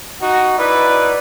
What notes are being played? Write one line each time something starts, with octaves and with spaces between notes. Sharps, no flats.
D#4 F#4
D#4 E4 B4 D5